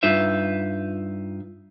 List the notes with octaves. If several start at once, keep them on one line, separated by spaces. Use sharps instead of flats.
G2 D#4 F4 B4 E5